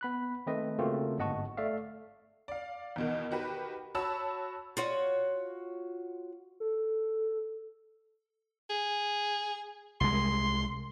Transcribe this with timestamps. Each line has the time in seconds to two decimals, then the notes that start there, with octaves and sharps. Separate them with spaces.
0.01 B3 B5 F#6
0.47 D#3 A3 C4 B4 D#5
0.79 C#3 A3 A#3 C4 F4 F#4
1.18 G1 G#2 D#5 F#5 A5 C#6
1.57 A3 D5 E5 F5
2.48 D5 F5
2.96 E2 B2 D#3
3.31 D#3 F#4 G4 B4
3.95 F#4 C#5 A5 B5 E6
4.77 F4 F#4 C#5
6.60 A4
8.70 G#4
10.01 C2 G#3 C6